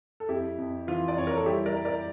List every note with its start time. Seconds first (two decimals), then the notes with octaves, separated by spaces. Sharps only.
0.20 A4
0.29 F2 E4 G4
0.58 F2
0.87 E3 F4
1.08 D5
1.17 F2 C#5
1.27 A#4
1.37 A4
1.46 G3 E4 G4
1.66 A#4 D5
1.75 G3
1.85 A#4 D5